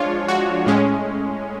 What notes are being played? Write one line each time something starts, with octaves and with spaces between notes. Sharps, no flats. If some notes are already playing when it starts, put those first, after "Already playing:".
Already playing: F3 G#3 D4 F4 C#5
F#4
A2 G#3 C#4